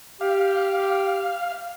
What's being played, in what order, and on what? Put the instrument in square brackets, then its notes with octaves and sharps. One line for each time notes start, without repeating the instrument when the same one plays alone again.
[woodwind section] G4 [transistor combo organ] F5